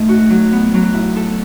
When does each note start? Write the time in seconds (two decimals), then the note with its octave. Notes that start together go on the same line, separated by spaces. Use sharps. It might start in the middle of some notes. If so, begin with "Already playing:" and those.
Already playing: A3 D#4
0.09 F#4
0.30 F#3
0.53 B3
0.74 F#3
0.94 E4
1.16 A4